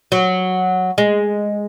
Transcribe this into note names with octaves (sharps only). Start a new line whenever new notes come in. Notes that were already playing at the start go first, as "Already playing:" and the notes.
F#3
G#3